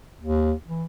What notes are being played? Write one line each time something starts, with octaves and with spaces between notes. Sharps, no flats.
D#2
E3